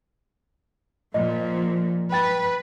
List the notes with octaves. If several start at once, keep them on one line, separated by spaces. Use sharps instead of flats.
A#2 F3 D#5
B4 G5 A6